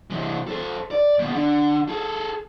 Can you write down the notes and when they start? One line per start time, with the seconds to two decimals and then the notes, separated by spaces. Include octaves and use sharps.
0.10 C3 E3
0.47 A4 C5
0.91 D5
1.19 D#2 B2
1.34 D3
1.89 G#4 A4